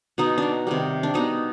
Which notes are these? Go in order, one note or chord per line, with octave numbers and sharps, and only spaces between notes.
B2 B3 D#4
D4 D#4
C3 D#3 G3
D4
B2 B3 D#4